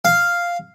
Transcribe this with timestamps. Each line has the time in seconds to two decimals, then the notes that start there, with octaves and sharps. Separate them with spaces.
0.05 F5